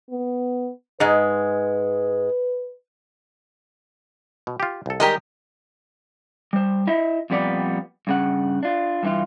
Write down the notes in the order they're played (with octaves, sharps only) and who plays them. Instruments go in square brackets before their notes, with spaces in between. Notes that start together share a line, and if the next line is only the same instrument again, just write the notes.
[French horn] B3
[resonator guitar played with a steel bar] G#2 G#3 [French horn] B4
[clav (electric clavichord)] B2
F4 G4
C2 A4
[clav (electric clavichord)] D#3 G3 G#3 [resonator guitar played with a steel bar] G4 A#4 D#5
[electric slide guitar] G3 C5
E4 D#5 E5
F2 A#2 G3 B3 D5
G2 C#3 F#5
D4 F4
G2 E3 F4